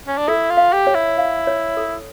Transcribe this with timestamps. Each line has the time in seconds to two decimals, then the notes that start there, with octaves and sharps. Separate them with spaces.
0.08 C#4
0.17 D4
0.28 E4 A4
0.50 F4
0.57 F5
0.73 G4
0.87 C#5
0.95 E4
1.18 F5
1.47 C#5
1.77 A4